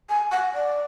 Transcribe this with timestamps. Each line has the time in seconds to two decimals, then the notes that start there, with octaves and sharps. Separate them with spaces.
0.09 G#5
0.31 F#5
0.54 D5